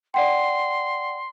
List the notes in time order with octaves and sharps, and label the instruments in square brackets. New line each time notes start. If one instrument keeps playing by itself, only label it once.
[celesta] D5 F#5 G5 [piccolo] C6